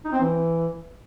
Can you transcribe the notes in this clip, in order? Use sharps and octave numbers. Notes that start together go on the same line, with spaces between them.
D#4
C4
E3